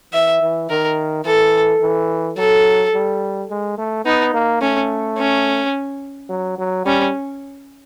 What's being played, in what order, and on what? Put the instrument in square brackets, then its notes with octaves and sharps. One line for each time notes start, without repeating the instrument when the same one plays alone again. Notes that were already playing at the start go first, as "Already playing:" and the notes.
[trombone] E3 [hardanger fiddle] E5
[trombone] E3
[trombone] D#3 [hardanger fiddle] A#4
[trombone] E3 [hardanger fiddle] A4
[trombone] E3
[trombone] F#3 [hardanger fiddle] A4
[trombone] G3
G#3
A3
[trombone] B3 [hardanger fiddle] D#4
[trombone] A#3
[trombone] A3 [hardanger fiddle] C#4
[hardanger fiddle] C#4
[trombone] F#3
F#3
[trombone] G3 [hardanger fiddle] C#4